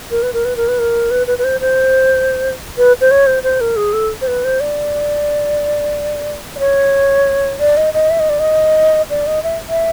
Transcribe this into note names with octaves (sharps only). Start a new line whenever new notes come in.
A#4
B4
A#4
B4
A#4
B4
A#4
B4
B4
B4
C5
C5
B4
C5
C#5
C5
C5
A#4
G#4
A4
C5
B4
C5
D5
D5
C#5
D5
D#5
D#5
E5
D#5
D5
D#5
D5
D#5
E5
E5